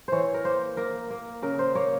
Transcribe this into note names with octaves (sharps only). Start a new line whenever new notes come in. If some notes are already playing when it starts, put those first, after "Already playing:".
E3 C5 C#5
A#4
A#3 C5
A#3 A#4
A#3
C#3 A#4
C5
A#3 C#5